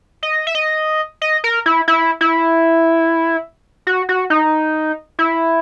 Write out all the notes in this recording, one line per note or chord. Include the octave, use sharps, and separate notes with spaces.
D#5
E5
D#5
D#5
A#4
E4
E4
E4
F#4
F#4
D#4
E4